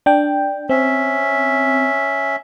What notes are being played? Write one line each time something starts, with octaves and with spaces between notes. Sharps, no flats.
D4 G5
C4 C#4 E5